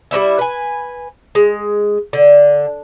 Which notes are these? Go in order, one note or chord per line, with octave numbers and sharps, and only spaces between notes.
G3 C#4 E4 E5
B4 G#5
G#3
D3